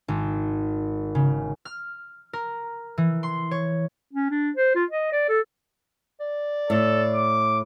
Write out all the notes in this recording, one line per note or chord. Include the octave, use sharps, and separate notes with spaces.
G#1
C#3
F6
A#4
E3
C6
C#5
C#4
D4
C5
F4
D#5
D5
A4
D5
A2 A4
D6